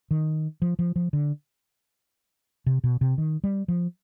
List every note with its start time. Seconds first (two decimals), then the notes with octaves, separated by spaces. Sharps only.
0.11 D#3
0.62 F3
0.79 F3
0.96 F3
1.13 D3
2.66 C3
2.84 B2
3.01 C3
3.18 D#3
3.44 G3
3.68 F3